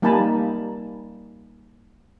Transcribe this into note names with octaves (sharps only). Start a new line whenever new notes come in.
G3 A#3 D#4 G#5 A5 B5